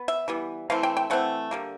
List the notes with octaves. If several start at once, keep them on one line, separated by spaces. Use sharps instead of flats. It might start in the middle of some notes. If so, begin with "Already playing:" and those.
Already playing: B3
E5
E3 G3 B3
E3 A3 C4 F5
G5
G5
E3 A3 C4 F#5
D3 G3 A#3